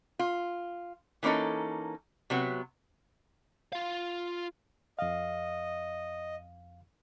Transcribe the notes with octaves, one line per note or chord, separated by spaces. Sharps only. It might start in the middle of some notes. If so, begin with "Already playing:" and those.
F4
E3 A#3 C#4 D#4 A4
C3 F#3 B3
F4 F5
F2 D#5 F5